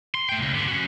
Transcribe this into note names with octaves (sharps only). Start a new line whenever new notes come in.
C6
A3 G5
C#2
D3 B3
C#4 F#4